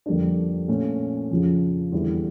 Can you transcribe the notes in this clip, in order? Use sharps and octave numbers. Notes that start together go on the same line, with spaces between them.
F2 D3 G3 A#3 D4
A#2 A3 C#4
F2 C#3 F3
E2 D3 G3 A#3 E4